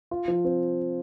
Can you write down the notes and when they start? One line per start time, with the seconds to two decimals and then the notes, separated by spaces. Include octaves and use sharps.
0.11 F4
0.28 F3
0.45 C4